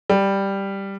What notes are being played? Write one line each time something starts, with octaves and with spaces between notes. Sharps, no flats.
G3